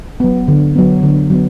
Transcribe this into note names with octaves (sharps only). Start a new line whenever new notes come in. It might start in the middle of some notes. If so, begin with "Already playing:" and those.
F#3 B3
D3
F#3 B3
D3
F#3 B3